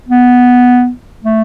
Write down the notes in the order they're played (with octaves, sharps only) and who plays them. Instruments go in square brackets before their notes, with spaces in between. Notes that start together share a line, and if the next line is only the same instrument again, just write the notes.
[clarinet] B3
A3